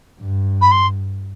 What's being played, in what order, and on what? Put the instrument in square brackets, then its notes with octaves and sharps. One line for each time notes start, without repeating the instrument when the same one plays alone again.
[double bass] G2
[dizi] B5
C6